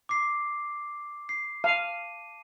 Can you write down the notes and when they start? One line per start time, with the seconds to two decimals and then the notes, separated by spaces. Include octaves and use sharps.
0.09 D6 C7
1.29 C7
1.64 F5 A5 D#7